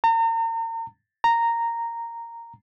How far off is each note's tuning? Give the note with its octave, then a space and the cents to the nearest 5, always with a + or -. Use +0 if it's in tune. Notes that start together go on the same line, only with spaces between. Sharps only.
A#5 -40
A#5 -10